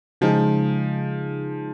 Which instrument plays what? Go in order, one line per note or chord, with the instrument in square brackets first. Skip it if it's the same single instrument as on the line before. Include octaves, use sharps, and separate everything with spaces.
[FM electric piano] C#3 G#3 D#4 G#4 [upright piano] F3